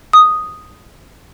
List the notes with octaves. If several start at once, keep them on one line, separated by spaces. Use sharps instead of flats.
D#6